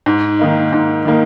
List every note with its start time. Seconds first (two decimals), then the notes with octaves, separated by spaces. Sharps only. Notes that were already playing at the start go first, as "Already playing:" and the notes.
0.06 G#2
0.39 D#3 A#3 D#4
0.73 G#2
1.05 D#3 A#3 D#4